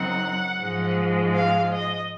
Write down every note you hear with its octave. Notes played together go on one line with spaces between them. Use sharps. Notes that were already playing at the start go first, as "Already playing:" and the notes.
Already playing: F#2 C#3 F#3 C4 D#4 F#5
G#2 F3 G#3
F5
D#5